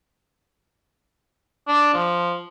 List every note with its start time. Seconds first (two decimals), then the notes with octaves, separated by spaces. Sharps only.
1.68 D4
1.94 F3